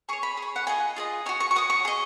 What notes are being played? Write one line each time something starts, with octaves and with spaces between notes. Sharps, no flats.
G#4 C#5 C#6
B5
G#4
C#5
F#5
F4 G#4 D#5 G#5
F4 G#4 D#5
F#4 C#5 G#5
C#6
C#6
F#4 C#5 D#6
C#6
G#4 D#5